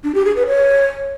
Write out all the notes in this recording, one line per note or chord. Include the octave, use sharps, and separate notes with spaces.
D4
G4
G#4
B4
C#5